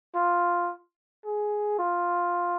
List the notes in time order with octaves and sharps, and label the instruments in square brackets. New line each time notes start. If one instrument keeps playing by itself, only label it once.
[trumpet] F4
G#4
F4